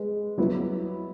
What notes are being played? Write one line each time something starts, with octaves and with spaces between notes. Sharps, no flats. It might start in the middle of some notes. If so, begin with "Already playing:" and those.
Already playing: G#3 B4
F#3 B3 E4 B4